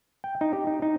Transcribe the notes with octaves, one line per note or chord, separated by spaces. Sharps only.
G5
D#4
G4
D#4
D#4